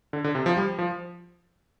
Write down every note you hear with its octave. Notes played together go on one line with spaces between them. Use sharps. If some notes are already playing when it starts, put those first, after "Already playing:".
D3
D3
C3
F3
G3
F3